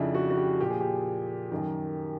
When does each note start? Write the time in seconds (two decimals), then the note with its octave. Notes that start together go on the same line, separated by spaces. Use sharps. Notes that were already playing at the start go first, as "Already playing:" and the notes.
Already playing: F2 C#3 F3 D4 E4
0.14 F#4
0.30 F#4
0.37 G4
0.60 A#2 F3 G4
0.70 G#4
0.81 G4
1.51 F#2 D#3